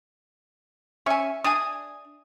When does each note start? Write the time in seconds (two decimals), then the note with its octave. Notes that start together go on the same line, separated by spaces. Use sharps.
1.06 C#4 E5 G#5 C#6
1.44 D4 G#4 G#5 D#6